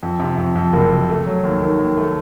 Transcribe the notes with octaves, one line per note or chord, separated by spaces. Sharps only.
F2
C3
F2
F2
F#1
F#1
A3
F#3
D#2
D#3
D#2
A3